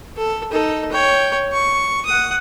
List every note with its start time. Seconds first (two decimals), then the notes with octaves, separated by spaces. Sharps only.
0.16 A4
0.52 D#4 A4
0.92 C#5 G5
1.52 C#6
2.06 F#5 D#6